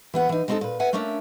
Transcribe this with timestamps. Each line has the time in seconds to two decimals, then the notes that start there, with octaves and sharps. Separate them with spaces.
0.14 E3 B3 F#5
0.29 E3 D#4
0.48 G#3 B3 C4 D4 D#4 A4
0.61 A#2 B4
0.80 B4 E5 F#5 G#5
0.93 A3 A#3 C#4 D4 E5